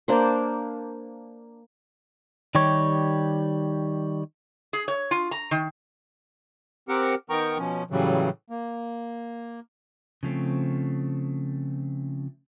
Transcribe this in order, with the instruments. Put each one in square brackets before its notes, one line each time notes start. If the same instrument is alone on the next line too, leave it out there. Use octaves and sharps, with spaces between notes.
[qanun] A#3 D4 C5
[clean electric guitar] D#3 G3 G4 C#5
[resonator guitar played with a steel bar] G#4
C#5
F4
A#5
D#3
[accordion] C4 G4 A#4 F#5
D#3 B3 A#4 G5 A#5 C#6
B2 F3 C#4
A2 C#3 E3 F#3 G3
A#3
[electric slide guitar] C#3 F3 A3 C4